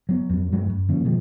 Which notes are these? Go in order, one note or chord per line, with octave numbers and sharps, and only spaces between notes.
F#3 B3
F2 F#3
F#2 F#3 G#3 A3
F#2
D3 F3 A#3 C#4
B2 D#3 F3 G#3